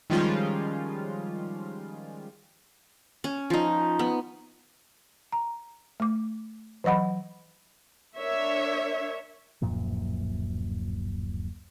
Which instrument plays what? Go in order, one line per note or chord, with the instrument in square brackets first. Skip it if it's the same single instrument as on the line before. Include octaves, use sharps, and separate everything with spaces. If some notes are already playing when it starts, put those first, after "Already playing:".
[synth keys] D#3 F3 G3 G#3 C#4 F4
[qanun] C#4
F3 D#4
B3
[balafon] A#5
A3 D6
E3 F#3 D#5 F#5 B5
[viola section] D4 A#4 C#5 E5
[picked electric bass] D1 F#2 A#2 F3